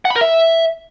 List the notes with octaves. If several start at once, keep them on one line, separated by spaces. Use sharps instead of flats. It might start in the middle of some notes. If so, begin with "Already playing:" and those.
F#5
B5
A#4
E5